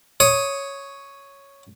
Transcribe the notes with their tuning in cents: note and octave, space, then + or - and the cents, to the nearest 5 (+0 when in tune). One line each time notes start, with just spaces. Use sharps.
C#5 +0 D#6 +0